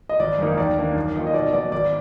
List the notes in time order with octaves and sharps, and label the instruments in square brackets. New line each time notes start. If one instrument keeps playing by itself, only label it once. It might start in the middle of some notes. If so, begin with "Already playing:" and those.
[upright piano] D#5
[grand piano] G#1 [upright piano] D5
[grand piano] F#2 D#3 A#3 D#4
[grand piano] D#2 [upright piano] D5
[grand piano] D#3 A#3 D4
F#2
D#3 A#3 F4
[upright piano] D#5
[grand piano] B2 [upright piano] D5
[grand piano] F#3 B3 [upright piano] D5
[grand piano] G#1 [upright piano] D5